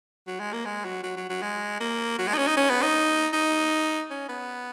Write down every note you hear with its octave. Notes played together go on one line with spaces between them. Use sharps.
F#3
G#3
A#3
G#3
F#3
F#3
F#3
F#3
G#3
A#3
F#3
G#3
D#4
C#4
D#4
C#4
B3
D#4
D#4
C#4
B3